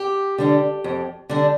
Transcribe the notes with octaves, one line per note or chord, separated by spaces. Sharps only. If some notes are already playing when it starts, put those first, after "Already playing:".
Already playing: G4
D3 G3 D4
F2
D3 G3 D4